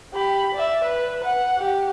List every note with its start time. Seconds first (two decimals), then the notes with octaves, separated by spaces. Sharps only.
0.13 G4 B5
0.54 D5 E5
0.84 B4
1.24 F#5
1.58 G4